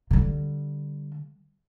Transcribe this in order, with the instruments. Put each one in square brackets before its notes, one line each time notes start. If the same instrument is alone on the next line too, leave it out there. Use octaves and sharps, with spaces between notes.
[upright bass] D3 G3